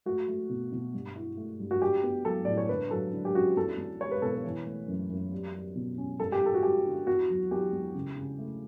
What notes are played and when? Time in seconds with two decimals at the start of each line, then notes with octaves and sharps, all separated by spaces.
0.06 A3 F#4
0.28 A3
0.49 B2
0.72 B2
0.94 G2
1.16 E4
1.37 A3
1.60 G2
1.71 F#4
1.81 D4 G4
2.03 B3
2.25 F#3 A4
2.45 A2 D5
2.57 C#5
2.69 D3 B4
2.91 F#3 A4
3.13 D3
3.25 G4
3.35 C#4 F#4
3.57 E2 A4
3.78 E2
4.01 G3 C#5
4.11 B4
4.22 B2 A4
4.33 B4
4.44 E3
4.66 A3
4.88 F#2
5.10 F#2
5.32 G3
5.54 G3
5.75 B2
5.98 C#4
6.20 G3 A4
6.32 G4
6.41 G3 A4
6.54 F#4
6.63 G3 G4
6.85 D3
7.07 E2 F#4
7.29 F#3
7.51 E2 G4
7.73 E2
7.95 C#3
8.17 C#3
8.39 A3